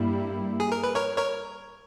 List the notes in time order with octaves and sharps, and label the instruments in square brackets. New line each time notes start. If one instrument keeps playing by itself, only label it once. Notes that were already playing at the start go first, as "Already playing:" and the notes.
Already playing: [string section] G2 G3 A#3 E4
[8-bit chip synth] G#4
A#4
B4
A#4 C#5
A#4 C#5